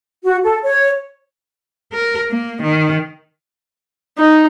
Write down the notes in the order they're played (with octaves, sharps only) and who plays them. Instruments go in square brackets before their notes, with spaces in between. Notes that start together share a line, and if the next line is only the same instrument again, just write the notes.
[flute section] F#4
A4
C#5
[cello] A#4
A#3
D#3
[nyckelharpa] D#4